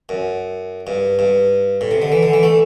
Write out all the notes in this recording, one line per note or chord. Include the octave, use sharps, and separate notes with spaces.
F#2
G2
G2
A2
C3
D3
E3
D3
E3
A3